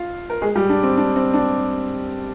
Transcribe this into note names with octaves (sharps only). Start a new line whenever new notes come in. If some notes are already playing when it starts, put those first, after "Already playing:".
Already playing: F4 F5
A#4
G#3 G#4
G3 G4
D4
C4
D4
C4
D4